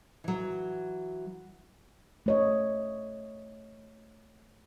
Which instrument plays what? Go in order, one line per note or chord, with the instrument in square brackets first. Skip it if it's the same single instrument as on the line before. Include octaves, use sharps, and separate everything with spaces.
[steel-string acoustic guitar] E3 F#3
[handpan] A3 C#5 D#5